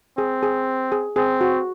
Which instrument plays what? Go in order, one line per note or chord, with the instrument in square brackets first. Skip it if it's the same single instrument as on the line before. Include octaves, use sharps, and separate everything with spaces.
[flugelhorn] C4 [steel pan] G#4
[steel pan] G#4
G#4
[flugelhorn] C4 [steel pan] G#4
[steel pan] F#4